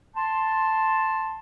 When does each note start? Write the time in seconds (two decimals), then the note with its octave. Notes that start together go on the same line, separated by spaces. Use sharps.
0.16 A5 C6